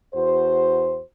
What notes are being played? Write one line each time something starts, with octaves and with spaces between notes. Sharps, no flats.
E2 F#4 C5